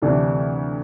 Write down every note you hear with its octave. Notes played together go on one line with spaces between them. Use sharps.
D2 C3 E3 A3 D4